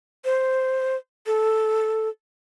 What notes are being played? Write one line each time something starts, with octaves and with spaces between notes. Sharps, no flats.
C5
A4